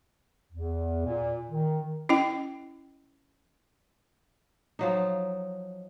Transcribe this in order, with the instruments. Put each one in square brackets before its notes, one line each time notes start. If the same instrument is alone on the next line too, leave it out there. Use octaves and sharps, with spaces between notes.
[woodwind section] E2
A#2
D#3
[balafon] C#4 E4 D#5 G5
[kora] F3 F#3 D#4